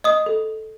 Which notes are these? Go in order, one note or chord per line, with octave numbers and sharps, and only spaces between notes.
D#5 D#6
A4